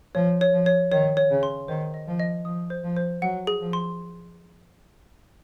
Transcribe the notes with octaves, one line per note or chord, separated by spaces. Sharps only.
F3 C#5
C#5
F3
C#5
D#3 C#5
C#5
C#3
C6
D#3 C5
D#5
F3
D#5
F3 D#6
C5
F3
C5
F#3 F#5
G#4
F3
C6